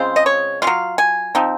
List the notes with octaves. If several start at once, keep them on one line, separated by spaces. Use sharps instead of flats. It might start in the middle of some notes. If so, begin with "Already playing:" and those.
Already playing: C#3 G#3 C4 F4 C5
D#5
C#5
C#4 F4 F5
F#3
G#5
F3 C4 D#4